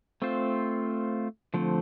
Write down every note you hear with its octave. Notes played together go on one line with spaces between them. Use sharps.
A3 C4 F4 C5
D3 F3 A3 C4